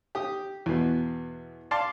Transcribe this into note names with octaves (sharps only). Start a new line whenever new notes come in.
G4 D#6
E2 B2
D5 F5 A5 C6 D6